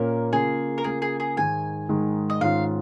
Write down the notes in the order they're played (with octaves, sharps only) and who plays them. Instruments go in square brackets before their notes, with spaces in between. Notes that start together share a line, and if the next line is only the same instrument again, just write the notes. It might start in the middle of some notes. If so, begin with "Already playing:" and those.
Already playing: [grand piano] A#2 A#3 C#4 [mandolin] A#4
[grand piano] C#3 A#3 F4 [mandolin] G#4
[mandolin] A#4
[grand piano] C#3 A#3 F4 [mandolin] G#4
[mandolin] G#4
G#4
[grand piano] G#2 D#3 G#3 [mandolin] G#5
[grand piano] G#2 D#3 G#3
[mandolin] D#5
[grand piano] G#2 D#3 C#4 F4 [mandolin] F5